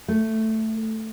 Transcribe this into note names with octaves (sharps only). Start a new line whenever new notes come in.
A3